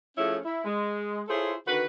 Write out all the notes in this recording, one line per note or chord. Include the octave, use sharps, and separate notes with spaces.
F3 A3 C#4 E4 G#4 C#5
E4
G#3
E4 F4 G#4 A4 C5 C#5
D3 D#3 F#4 B4